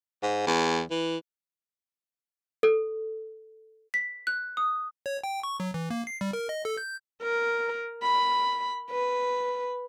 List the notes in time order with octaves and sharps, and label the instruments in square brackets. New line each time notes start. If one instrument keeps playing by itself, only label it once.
[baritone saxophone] G#2
E2
E3
[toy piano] A4
[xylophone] B6
F#6
D#6
[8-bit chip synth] C#5
G5
C#6
F#3
E3
A#3
C7
G3
A#4
D#5
A4
G6
[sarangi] A#4
B5
B4